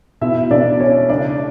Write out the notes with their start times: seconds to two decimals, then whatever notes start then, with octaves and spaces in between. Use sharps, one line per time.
0.21 B2 E4 E5
0.51 B2 D4 D5
0.80 C#4 C#5
1.09 C#3 D4 D5